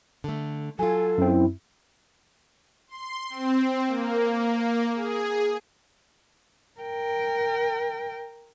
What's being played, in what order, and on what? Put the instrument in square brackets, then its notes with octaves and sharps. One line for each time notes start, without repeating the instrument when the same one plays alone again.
[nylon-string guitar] D3 A3
[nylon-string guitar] F#3 F4 [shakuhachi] A4 [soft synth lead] G#5
[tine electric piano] F#2 C4 [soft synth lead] E4
[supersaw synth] C6
C4
A#3
G#4
[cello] A#4 G5